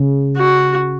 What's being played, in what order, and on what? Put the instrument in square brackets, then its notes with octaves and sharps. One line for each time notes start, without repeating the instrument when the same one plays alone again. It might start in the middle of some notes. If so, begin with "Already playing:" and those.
Already playing: [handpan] C#3
[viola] F#4